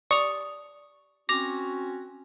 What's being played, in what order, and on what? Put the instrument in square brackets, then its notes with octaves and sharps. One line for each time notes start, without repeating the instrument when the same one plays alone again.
[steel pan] D5 [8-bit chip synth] C#6 [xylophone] D#6 F7
[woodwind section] C4 C#4 F#4 [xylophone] D6 F7 [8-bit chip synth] A#6